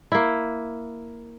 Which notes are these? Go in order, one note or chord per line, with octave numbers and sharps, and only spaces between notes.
A#3 E4